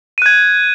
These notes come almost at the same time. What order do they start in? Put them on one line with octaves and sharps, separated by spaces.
D#7 F#6 G#6